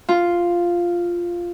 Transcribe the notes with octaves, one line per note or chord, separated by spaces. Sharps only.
F4